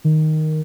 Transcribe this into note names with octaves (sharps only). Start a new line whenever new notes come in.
D#3